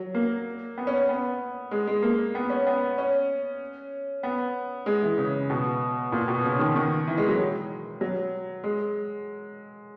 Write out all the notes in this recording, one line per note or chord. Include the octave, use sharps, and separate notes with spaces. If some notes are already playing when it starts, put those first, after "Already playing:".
Already playing: F#3
A#3
B3
C#4
C#4
B3
G#3
G#3
A#3
B3
C#4
B3
C#4
B3
G#3
E3
C#3
B2
A#2
B2
C#3
D#3
D#3
E3
G#3
F#3
F#3
G#3